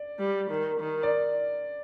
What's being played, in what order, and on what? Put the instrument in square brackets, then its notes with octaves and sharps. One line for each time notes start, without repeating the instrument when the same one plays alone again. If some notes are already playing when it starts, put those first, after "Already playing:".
Already playing: [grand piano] D5
[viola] G3
D#3
D#3
[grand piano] D5